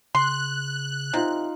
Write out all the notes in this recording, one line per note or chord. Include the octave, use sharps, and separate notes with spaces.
C#3 C6 F#6
C3 D#4 F4